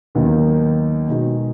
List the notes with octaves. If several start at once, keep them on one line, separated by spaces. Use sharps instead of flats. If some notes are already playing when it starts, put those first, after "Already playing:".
D#2 D#3 F#3 B3 D#4
B2 G#3 D#4 F#4